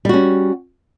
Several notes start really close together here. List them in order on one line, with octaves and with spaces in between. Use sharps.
G3 F#4 C#4